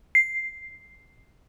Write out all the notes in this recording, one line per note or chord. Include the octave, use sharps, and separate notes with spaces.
C7